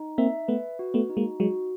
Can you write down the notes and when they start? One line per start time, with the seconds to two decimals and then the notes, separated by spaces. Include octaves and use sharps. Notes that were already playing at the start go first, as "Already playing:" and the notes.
Already playing: D#4
0.18 A#3 C4 E5
0.48 A3 B3 B4
0.79 F#4
0.94 A3 B3
1.09 D#4
1.17 G#3 A#3
1.40 F#3 G#3 F#4